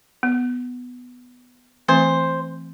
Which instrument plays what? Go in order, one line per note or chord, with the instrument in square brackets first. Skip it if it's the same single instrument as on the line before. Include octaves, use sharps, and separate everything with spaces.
[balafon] B3
[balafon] E3 A3 C4 [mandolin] C5